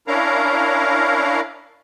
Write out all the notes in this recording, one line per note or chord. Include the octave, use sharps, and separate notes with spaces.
C#4 D4 E4 A#4 F5 A#5